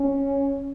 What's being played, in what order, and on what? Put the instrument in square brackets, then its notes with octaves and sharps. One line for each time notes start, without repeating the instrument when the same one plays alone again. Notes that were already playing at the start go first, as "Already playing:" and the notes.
Already playing: [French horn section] C#4